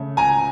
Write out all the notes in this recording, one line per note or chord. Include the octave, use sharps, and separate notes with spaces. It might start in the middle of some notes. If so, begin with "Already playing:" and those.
Already playing: C#3 A3
C#2 G#5 A#5